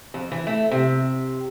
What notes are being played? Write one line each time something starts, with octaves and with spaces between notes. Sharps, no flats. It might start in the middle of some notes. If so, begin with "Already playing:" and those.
F2
E3
A3
C3